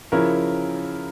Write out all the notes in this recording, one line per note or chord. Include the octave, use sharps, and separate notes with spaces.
C#3 F3 C#4 E4 A#4